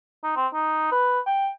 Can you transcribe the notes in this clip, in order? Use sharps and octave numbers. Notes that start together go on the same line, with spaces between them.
D#4
C4
D#4
B4
G5